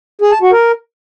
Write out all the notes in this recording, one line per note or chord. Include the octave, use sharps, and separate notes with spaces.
G#4
A5
F#4
A#4